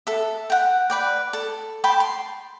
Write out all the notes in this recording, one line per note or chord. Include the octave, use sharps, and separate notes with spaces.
A4 E5
F#5 G5
B4 D5 G5
A4
G5 A5 B5 C6
C6